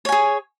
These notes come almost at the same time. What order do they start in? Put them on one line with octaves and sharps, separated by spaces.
C#5 G#5 G#4